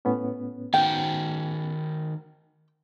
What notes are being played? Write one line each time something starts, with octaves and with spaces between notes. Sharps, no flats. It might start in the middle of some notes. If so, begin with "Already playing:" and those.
A2 B3 C#4
D#3 F#4 G5